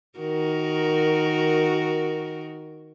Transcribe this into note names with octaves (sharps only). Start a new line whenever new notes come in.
D#3 F#4 A#4